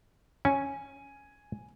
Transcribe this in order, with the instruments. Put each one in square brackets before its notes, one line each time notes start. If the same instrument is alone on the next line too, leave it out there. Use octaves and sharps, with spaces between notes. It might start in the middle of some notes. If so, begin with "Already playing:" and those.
[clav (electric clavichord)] C#4 [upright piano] G#5